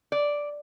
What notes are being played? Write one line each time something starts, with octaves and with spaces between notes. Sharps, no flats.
D5